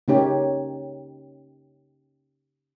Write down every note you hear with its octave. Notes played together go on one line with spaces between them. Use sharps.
C#3 A#3 C#4 D#4 G4 C#5